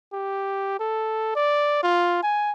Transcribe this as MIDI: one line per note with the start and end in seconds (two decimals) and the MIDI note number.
0.13 0.78 67
0.79 1.34 69
1.36 1.82 74
1.83 2.20 65
2.23 2.52 80